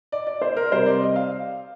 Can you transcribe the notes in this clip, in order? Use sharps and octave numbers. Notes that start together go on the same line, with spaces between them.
D5
D5
C5
A#4
C3 G3 C5
D5
D#5
F5